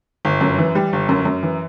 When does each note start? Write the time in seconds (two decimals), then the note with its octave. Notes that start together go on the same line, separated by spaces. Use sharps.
0.25 G1
0.41 F#2
0.58 E3
0.75 G3
0.93 G1
1.09 F#2
1.25 F#2
1.43 E3